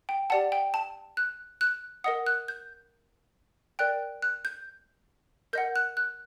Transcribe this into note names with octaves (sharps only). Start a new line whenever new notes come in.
G5
G4 D5 F#5 A5
G5
A5
F#6
F#6
A#4 D#5 F#5 D#6
F#6
G6
A#4 D5 G5 F#6
F#6
G6
A#4 D#5 F#5 G6
F#6
F#6